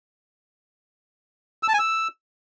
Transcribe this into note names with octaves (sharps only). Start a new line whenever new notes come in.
E6
A5
G#5
E6